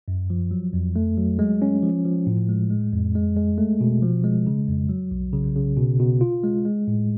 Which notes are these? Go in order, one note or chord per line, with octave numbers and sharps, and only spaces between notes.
F#2
F3
F#3
F2
A3
F#3
G#3
C#4
F3
F3
A2
G#3
G#3
F2
G#3
G#3
A3
B2
F3
G#3
C#3
F2
F#3
B1
C#3
C#3
B2
B2
F4
G#3
G#3
A2